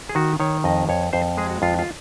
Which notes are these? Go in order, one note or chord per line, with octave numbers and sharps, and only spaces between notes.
G#4
D#3 F#4
D#3 C#5
F2 D#5
F2 C#5
F2 C5
G#3 G#4
F#4
F2 F4
F4